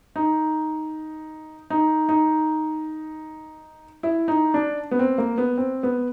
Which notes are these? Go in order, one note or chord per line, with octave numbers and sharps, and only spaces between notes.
D#4
D#4
D#4
E4
D#4
D4
B3
C4
A#3
B3
C4
B3